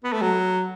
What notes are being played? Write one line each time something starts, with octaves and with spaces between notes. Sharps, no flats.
B3
A3
F#3